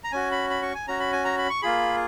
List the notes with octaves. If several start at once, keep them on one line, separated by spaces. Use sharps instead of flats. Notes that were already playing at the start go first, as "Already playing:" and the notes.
A#5
C#4 F#4 G#5
B5
B5
C#6
G#5
C#4 F#4 A#5
B5
G#5
A#5
B5
C#6
A#3 F4 G#4 B5